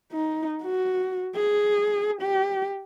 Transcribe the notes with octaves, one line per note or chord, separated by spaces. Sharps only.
D#4
F#4
G#4
G4